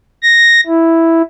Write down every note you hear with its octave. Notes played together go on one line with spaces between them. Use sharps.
A#6
E4